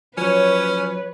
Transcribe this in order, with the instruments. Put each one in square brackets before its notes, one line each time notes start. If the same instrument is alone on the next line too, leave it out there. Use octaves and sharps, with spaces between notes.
[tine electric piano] F3 F#3 [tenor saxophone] C#4 [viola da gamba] B4 [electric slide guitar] C#5